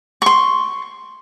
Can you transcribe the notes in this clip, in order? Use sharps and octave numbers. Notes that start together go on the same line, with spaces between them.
C6 C#6